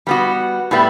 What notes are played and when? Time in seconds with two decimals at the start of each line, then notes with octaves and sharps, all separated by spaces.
0.07 G3 B3 F#4
0.71 A2 G3 B3 E4